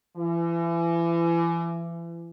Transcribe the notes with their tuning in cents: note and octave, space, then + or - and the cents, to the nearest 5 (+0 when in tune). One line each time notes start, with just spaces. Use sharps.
E3 +35